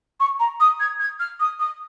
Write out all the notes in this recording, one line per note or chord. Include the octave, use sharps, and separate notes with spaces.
C#6
A#5
D#6
G#6
G#6
F6
D#6
D#6